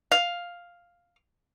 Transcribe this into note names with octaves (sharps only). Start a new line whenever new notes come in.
F5